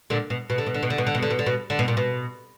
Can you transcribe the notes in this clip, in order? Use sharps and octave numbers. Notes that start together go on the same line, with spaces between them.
A#2 D3
B2
B2
D3
B2
D3
B2
D3
B2
D3
B2
D3
B2
D3
B2
D3
B2
A#2
B2